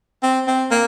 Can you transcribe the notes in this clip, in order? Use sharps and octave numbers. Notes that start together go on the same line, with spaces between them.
C4
C4
A#3